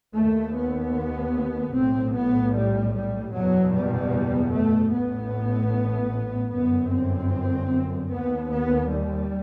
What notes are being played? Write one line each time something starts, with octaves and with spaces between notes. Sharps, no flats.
D#2 A3
B3
B1 A2 C4
B3
G3
G3
F#1 E2 B2 F#3
G3
A3
A1 A2 B3
G1 F#2 B3
C4
D#2 B3
B3
G3